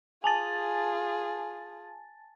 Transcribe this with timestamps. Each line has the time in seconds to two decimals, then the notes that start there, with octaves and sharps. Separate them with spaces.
0.24 F4 G#4 G#5 A5 A6